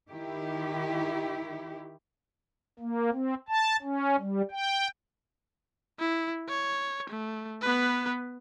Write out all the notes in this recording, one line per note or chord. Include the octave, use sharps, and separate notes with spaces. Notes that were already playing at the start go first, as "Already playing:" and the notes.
D#3 E4 G4
A#3
C4
A5
C#4
G3
G5
E4
C#5
A3
B3 B4